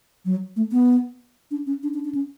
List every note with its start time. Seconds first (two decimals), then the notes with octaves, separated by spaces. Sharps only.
0.25 F#3
0.56 A3
0.72 B3
1.51 D4
1.66 C#4
1.83 D4
1.94 D4
2.04 D4
2.14 C#4